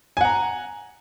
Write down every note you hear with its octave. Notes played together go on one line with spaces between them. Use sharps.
F#5 G#5 A#5